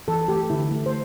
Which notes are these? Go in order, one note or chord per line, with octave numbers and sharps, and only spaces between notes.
E3 A4
A3 G4
D3 E4
A3
C5